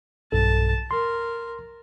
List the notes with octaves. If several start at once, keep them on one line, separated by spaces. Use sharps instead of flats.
B1 G2 A4 A5
A#4 C6